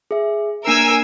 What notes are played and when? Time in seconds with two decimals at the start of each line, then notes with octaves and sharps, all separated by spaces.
0.11 G#4 E5
0.66 A#3 D4 A#4 G#5 E6 C7